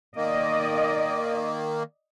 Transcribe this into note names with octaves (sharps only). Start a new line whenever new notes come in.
D#3 A#3 D5 D#5